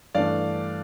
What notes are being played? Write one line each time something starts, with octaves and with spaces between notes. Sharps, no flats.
G2 E3 A3 D4 D5 F5